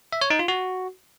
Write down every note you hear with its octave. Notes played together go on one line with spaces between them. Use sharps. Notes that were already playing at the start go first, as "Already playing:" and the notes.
E5
C#5
D#4
F4
F#4